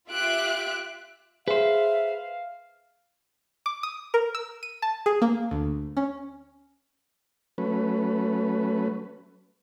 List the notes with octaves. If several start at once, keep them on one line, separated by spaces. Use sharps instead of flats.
F4 G4 E5 F#6 D7
G#4 B4 C5 E5 F5
D6
D#6
A#4
E6
D#7
A5
G#4
A#3
D2
C#4
F#3 A3 C#4 B4